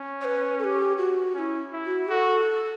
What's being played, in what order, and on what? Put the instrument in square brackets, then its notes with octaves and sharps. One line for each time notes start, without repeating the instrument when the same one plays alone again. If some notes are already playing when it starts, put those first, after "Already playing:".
Already playing: [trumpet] C#4
[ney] C#5
B4
A4
G4
F#4
[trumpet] C#4 [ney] F#4
[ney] E4
[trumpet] E4
[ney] F#4
[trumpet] F#4 [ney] A4